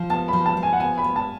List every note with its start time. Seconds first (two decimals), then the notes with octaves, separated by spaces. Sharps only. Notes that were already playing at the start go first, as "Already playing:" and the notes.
Already playing: F3
0.10 B3 A5
0.28 F3 B5
0.46 A5
0.57 F3
0.63 G#5
0.73 F#5
0.80 B3 G#5
0.98 B5
1.04 B3
1.16 A5